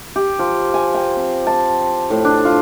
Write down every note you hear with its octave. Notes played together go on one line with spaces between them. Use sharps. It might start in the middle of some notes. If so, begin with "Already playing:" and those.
G4
F3
G#5
G5
C4
A5
A2
D4
F4